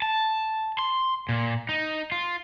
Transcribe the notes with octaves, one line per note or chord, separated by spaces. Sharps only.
A5
C6
A#2
D#4
F4